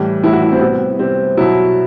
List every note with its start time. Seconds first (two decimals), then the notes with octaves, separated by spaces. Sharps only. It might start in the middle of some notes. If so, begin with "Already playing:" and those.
Already playing: A2 E3 G3
0.23 A2 E3 G3 E4
0.33 F#4
0.43 E4
0.52 C4
0.61 C3 G3 B3
0.99 C3 G3 C4
1.37 B2 F#3 E4